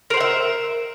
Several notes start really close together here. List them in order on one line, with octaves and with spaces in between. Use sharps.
A#4 C5 F#5 E5